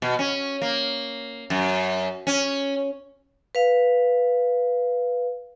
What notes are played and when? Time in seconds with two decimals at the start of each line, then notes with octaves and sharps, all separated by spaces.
0.02 B2
0.19 C#4
0.62 A#3
1.50 F#2
2.27 C#4
3.55 B4 F5